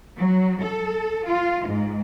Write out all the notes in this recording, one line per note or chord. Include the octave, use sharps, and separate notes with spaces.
F#3
A4
F4
G#2